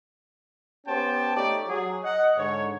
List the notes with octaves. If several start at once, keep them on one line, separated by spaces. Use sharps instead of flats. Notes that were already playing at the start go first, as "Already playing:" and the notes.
B3 C#4 G4 C5 G5 A5
A3 D#4 G4 C#5 D5
F#3 G#4
D#5 F#5
G#2 D3 C#5